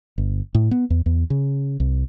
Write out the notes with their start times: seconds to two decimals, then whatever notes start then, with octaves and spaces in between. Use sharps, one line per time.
0.18 G1
0.55 A2
0.71 B3
0.90 E2
1.06 E2
1.30 C#3
1.80 C2